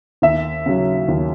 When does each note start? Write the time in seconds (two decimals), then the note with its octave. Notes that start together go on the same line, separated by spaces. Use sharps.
0.22 D#2 E5
0.66 C#3 F#3
1.08 D#2